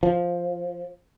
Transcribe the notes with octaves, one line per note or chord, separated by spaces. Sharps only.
F3